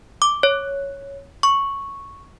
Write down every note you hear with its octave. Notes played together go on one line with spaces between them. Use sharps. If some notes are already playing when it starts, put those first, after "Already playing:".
D6
C#5
C#6